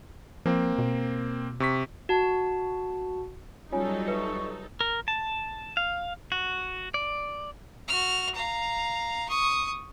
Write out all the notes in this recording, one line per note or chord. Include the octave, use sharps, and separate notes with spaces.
F3 A#3 C4
B2
C3 C#6 B6
F#4 A5
F#3 G3 C#4 D#4 F4 A4 G#5
B4 E5 C#6
A#4
A5
F5
F#4
D5
F#4 F6
F5 A#5
C#6 D#6